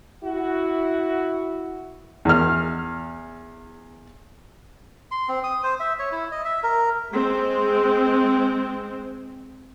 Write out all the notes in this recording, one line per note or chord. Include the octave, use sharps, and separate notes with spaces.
E4 F#4
E2 F6
C6
C4
D#6
C5
E5
C#5
E4
D#5
E5
A#4
G#3 C4